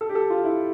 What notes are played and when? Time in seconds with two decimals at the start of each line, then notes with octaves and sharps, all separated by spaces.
0.01 A4
0.09 G4
0.15 A4
0.30 F4
0.44 E4